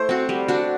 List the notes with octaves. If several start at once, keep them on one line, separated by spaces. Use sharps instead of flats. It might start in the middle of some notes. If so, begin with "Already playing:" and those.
Already playing: A3 E4 C5
C4 F#4
G3
D4 F#4